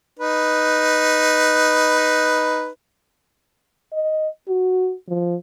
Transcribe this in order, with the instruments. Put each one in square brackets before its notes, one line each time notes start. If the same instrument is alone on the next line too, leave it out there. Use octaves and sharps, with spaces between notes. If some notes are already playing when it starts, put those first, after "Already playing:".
[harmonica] D#4 B4
[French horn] D#5
F#4
F3